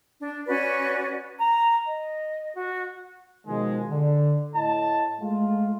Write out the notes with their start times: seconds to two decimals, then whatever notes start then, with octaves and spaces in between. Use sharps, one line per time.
0.19 D4
0.47 C#4 F#4 B4 D5
1.39 A#5
1.86 D#5
2.55 F#4
3.47 B2 D#3 F3 G#3
3.90 D3
4.55 A2 D#5 A5
5.21 G#3 A3 F4